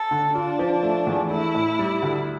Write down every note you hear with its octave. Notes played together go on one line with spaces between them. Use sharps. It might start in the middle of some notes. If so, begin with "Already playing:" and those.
Already playing: A4
D3
D4 F4
F3
A3
E2
A3 E4
A2
G3
D2